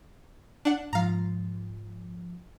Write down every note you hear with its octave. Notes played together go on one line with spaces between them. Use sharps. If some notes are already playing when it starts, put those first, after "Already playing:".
D4 F#5
G#2 F3 F5 A#5